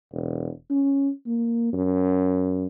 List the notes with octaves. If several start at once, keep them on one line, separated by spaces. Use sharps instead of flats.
E1
C#4
A#3
F#2